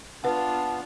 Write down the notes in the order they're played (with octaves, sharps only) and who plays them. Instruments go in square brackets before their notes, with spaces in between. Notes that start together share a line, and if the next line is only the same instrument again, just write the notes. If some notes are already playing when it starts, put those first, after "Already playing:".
[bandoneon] B3 [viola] D4 F4 [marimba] B4 F#5 [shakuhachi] A5